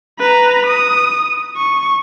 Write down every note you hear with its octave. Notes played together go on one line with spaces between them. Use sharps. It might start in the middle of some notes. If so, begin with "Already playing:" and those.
B4 A#5
D#6
C#6